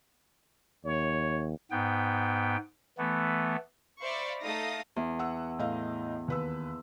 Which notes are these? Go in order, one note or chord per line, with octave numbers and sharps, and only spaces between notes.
D#2 C#5
G#2 B3 G5
E3 A3 B3
C5 D5 E5 F5 B5 C#6
A3 D#4 A4 F5 D#6 A#6
E2
F#5 E6
A2 D#5 F5
D#2 B4 E6